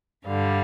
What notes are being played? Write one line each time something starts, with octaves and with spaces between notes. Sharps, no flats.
G2 D3 G3 F5